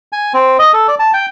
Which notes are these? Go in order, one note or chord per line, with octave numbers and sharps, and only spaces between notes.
G#5
C4
D#5
A4
D5
A5
G5